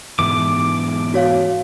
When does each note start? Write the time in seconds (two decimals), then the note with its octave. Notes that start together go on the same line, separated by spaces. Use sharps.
0.19 G#2 B2 E3 D6
1.14 F#4 C#5 F5